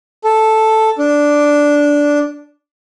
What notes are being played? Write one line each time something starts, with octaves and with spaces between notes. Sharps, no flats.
A4
D4